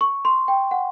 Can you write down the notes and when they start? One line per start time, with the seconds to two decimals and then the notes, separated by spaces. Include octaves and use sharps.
0.01 C#6
0.25 C6
0.48 G5
0.71 F#5